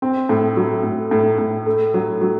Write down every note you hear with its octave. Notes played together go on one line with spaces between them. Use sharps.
C4
A2
F#3
A2
A2
A2
A3
F#3
F#3